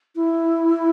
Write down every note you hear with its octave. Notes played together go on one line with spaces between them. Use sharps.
E4